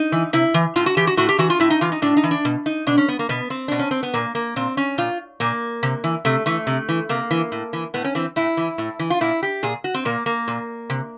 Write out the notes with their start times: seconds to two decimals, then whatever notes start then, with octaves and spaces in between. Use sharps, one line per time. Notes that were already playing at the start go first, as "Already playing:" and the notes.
Already playing: D#4
0.12 E3
0.33 C3 E4
0.54 E3
0.76 A2 F4
0.86 F#4
0.97 E3 G4
1.07 F#4
1.17 A2 F#4
1.29 G4
1.38 E3 F#4
1.50 F4
1.60 A2 E4
1.70 D#4
1.81 E3 F4
1.92 D#4
2.02 A2 D4
2.17 D#4
2.23 E3
2.31 D4
2.45 B2
2.66 D#4
2.87 B2 D4
2.98 C#4
3.08 B3
3.19 A#3
3.29 B2 B3
3.50 C4
3.68 B2 D4
3.79 C#4
3.91 C4
4.03 B3
4.14 A#2 A#3
4.35 A#3
4.56 A#2 C4
4.77 C#4
4.98 A#2 F4
5.40 A#2 A#3
5.83 C3
6.04 E3
6.25 C3 A3
6.46 E3 A3
6.67 C3
6.89 E3
7.09 C3 A#3
7.31 E3
7.52 A2
7.73 E3
7.94 A2 B3
8.04 C#4
8.15 E3 C4
8.36 A2 E4
8.57 E3
8.78 A2
8.99 E3
9.10 F4
9.21 A#2 E4
9.43 G4
9.63 A#2 G#4
9.84 F#4
9.94 C4
10.05 A#2 A#3
10.26 A#3
10.48 A#2
10.90 C3